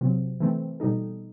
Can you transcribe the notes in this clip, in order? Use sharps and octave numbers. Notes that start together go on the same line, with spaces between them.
C3 F#3 C4
E3 A3 C4
B2 G3 D#4 A4